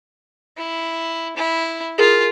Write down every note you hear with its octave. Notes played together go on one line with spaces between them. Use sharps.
E4
E4
F4 G#4 A#4